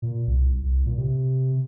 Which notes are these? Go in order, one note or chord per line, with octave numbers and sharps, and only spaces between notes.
A#2
C2
C2
A#2
C3